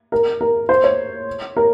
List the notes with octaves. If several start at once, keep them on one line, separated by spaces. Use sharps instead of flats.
A#4
A#4
C5
C#5
A#4